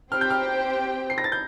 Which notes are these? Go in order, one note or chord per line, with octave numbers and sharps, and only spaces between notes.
C4 G4 C5 G5 F6
G6
F6
C7
A#6
A6
G6